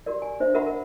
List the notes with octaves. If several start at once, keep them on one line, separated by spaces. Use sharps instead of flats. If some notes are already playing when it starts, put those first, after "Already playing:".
F#4 G4 A#4 D5
G#5
D4 C5 E5
F#4 A#4 E5 F#5 B5
A#4 E5